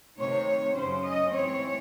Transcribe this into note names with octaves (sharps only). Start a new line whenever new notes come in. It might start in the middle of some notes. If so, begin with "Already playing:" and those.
C3 D#3 A3 C#5
F#2 C#3 F#3 C#4 C5
D#5
G#2 E3 C4 C#5